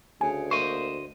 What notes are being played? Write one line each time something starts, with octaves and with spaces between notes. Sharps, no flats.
D2 C#3 G#5
A#3 C5 D#5 C#6